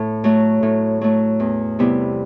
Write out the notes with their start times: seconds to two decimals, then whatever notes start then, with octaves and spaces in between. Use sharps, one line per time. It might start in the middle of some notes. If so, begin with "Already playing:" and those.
Already playing: A2
0.24 F#3 A3
0.63 A2
1.01 F#3 A3
1.40 E2
1.79 C3 G3 B3 E4